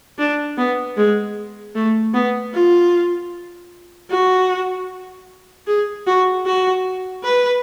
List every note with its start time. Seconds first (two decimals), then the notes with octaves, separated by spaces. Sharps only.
0.19 D4
0.57 B3
0.97 G#3
1.75 A3
2.14 B3
2.53 F4
4.10 F#4
5.67 G#4
6.07 F#4
6.46 F#4
7.24 B4